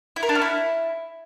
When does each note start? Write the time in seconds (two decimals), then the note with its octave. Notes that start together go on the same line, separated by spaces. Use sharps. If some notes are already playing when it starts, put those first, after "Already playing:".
0.16 E4
0.23 A#4
0.29 D4
0.35 C#4
0.42 E4